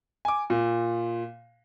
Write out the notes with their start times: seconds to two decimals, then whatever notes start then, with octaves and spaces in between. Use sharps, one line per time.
0.25 G#5 D6
0.50 A#2